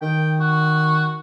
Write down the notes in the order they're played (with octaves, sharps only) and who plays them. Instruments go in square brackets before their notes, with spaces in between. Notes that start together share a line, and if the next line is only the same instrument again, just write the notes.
[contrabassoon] D#3 [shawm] G5
[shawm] F#4